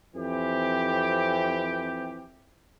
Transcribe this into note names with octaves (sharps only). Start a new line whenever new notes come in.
F2 E3 C4 G4